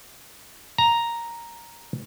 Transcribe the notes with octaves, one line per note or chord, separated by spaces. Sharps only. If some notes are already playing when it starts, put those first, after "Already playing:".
A#5